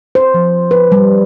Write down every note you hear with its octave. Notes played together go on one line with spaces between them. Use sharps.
C5
F3
B4
G3